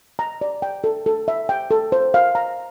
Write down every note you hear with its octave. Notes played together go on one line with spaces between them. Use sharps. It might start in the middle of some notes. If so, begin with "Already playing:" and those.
A#5
D5
G5
A4
A4
E5
G5
A4
C5
F5
A#5